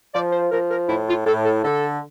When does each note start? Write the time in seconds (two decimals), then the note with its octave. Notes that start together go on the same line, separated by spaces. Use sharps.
0.14 F3 D5
0.33 C5
0.51 F3 A#4
0.70 A#4
0.89 A2 E4
1.08 F4
1.26 A2 A4
1.45 A4
1.64 D3 A4